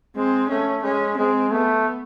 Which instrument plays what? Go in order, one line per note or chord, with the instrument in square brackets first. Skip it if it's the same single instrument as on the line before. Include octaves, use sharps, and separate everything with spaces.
[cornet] G#3 [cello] C4
[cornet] A3 [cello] C#4
[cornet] G#3 [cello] C#4
[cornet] G#3 [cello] C4
[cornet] A3 [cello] B3